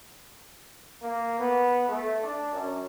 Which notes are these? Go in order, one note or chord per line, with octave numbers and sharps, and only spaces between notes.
A#3
B3
A3
D4
F#2